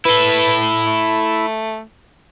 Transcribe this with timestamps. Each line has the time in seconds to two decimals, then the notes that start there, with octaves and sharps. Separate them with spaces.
0.05 E4 A4 B4
0.86 A3